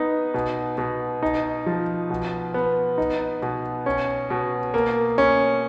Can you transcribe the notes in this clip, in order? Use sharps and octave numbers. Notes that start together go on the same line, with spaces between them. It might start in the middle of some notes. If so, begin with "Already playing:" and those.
Already playing: B3 D#4
B2
B2
D#4
F3
B2
B3
D#4
B2
C#4
B2
A#3
C#4